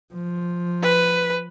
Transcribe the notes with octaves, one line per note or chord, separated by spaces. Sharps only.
F3
B4